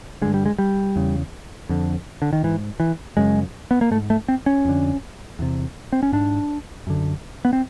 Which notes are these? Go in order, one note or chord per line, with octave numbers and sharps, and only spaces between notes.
G2 D3 G#3
G3
G#3
G3
E2 C#3
F2 D3
D3
D#3
G#2 E3
E3
F#2 C#3 G#3
B3
A#3
G#2 A3
A3
C4
C#4
F2 D3
E2 C3
C4
C#4
G#2 D4
F#2 D3
B3
C4